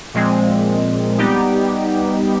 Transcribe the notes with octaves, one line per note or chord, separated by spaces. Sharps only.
A#2 F3 G#3 C4
G3 B3 D#4 G4